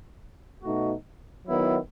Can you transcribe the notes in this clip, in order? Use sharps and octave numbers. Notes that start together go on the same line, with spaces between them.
B2 A3 D#4 F#4
D#3 F#3 B3 E4